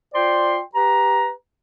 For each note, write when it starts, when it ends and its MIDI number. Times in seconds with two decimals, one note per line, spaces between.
0.14 0.58 65
0.14 0.58 72
0.14 0.58 74
0.14 0.58 79
0.14 0.58 84
0.75 1.31 67
0.75 1.31 71
0.75 1.31 82